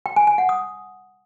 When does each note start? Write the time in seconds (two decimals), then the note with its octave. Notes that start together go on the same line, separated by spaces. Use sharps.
0.06 G5
0.16 G#5
0.27 G#5
0.38 F#5
0.49 D#6